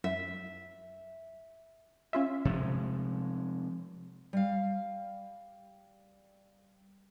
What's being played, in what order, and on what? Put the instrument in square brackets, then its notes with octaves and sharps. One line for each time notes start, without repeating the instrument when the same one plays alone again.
[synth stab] F#2 [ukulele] E5
[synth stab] C#4 F4 E5
[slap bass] C3 F3 G#3
[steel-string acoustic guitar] G3 F5